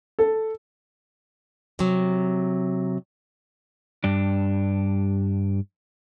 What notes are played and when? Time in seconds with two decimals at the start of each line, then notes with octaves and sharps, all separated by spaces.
0.19 A4
1.79 C3 F#3
4.04 G2 D4